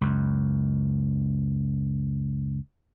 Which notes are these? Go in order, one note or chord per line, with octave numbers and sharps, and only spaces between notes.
C#2 F#2